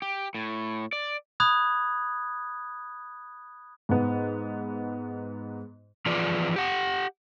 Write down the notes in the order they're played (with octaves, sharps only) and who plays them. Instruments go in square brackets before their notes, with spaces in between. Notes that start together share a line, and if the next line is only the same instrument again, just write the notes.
[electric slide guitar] G4
A2
D5
[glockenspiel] B5 D#6 F#6 G#6
[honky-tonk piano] G#2 B3
[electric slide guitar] E3 F3 F4 G#4 B4 D5
G4 F#5